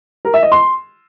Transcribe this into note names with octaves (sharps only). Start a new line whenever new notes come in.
A#4
E5
D#5
C6